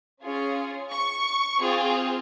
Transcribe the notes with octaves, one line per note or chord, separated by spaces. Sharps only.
C#4 F4 G#4
C#6
C4 F4 G#4